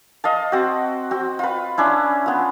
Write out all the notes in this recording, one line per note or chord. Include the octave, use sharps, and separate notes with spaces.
D#5 F5 A5
C4 F#4
C4 F#4
F4 B4
C#4 D4 E4
B3 F4